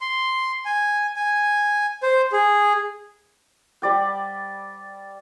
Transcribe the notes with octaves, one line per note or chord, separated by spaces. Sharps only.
C6
G#5
G#5
C5
G#4
G3 D5 G5